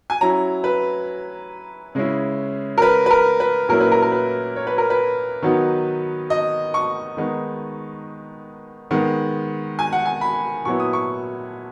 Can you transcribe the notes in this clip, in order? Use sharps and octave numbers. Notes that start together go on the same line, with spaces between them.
G#5
F#3 C#4 E4 A#5
B4
C#3 G#3 C#4 E4
A#4
B4
B4
A#4
B4
A#2 F#3 A#3 C#4 E4 A#4
B4
A#4
A#4
B4
C#5
B4
A#4
B4
D#3 F#3 B3 D#4
D#5
C#6
D#3 G#3 B3 D#4
D#3 G#3 B3
G#5
F#5
G#5
B5
A#2 F#3 B3 E4 C#6
D#6
C#6